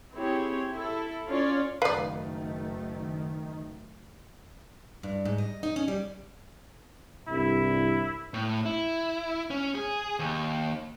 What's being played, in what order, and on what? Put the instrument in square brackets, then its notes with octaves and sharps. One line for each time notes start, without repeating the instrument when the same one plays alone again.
[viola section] C4 E4 G4 G#4 C#5
E4 A4
C#4 F4 C#5 D5
[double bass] F#1 A3 [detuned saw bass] D#3 [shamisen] B4 D5 [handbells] F5
[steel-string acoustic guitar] G2
G#2
D#5
D#4
C#4
G3
[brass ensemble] C2 G2 [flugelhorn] E4
[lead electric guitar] A2
E4
C#4
G#4
D#2